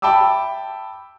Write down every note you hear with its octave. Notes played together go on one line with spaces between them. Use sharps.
E5 G5 A5 B5 D6 E6